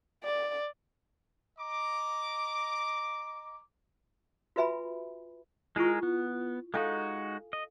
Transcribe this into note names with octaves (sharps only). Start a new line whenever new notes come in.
D5
D#5 A#5 D6
F4 F#4 B4 E5 G#5 B5
G#3 E4 F4 G#4 A#4 C#6
B3
G#3 D#4 F#4 A4 F5 G#5
D#5